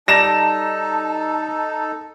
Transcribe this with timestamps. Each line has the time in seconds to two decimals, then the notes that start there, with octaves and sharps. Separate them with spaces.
0.08 G3 D#4 A4 A5 A#5 A#6 E7